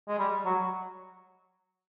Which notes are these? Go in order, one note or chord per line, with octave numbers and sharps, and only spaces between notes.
G#3
G3
F#3